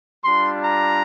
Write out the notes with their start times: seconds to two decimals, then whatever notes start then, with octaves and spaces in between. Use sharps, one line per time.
0.24 G3 D4 F4 C6
0.64 A#5